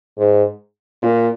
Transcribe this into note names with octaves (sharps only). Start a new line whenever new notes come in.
G#2
A#2